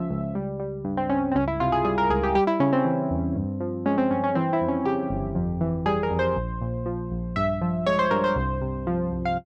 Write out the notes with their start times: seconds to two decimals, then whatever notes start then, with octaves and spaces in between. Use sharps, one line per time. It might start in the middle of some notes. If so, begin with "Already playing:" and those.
Already playing: C#2 C#3 F3 E5
0.10 C#2
0.35 G3
0.60 G3
0.85 G2
0.97 C4
1.10 G2 C#4
1.32 C4
1.35 C#2 C#4
1.48 E4
1.60 C3 F4
1.72 G#4
1.85 G3 G#4
1.98 A#4
2.10 C#2 G#4
2.23 G4
2.35 G3 G4
2.47 E4
2.60 C#3 C#4
2.73 C4
2.85 E3
3.10 E2
3.36 G2
3.60 F3
3.85 G#3 C#4
3.98 C4
4.11 G2 C#4
4.24 C#4
4.35 E3 C4
4.53 E4
4.61 F2
4.68 C#4
4.85 C#3 G4
5.10 G1
5.35 F2
5.61 E3
5.86 G3 G#4
6.03 A#4
6.11 F2
6.19 C5
6.36 A#1
6.61 A#2
6.86 F3
7.11 A#1
7.36 G2 E5
7.61 F3
7.86 G#3 C#5
7.99 C5
8.11 G2 A#4
8.24 C5
8.36 C2
8.61 C3
8.87 F3
9.12 C2
9.25 F5